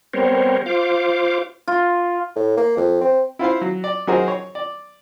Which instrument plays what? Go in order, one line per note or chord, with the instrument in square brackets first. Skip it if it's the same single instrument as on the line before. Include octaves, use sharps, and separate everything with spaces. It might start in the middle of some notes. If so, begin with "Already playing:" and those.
[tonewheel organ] G3 B3 C4 A#4 C5 C#5
F4 C5 F5 D6
[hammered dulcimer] F4
[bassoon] A2
A#3
F2
C4
[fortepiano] E4 F4 C5 F5
F#3
D5
F#3 D#4 F#4 G#4 A#4 C5
C#5
D5